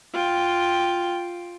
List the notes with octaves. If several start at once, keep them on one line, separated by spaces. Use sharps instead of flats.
F4 G5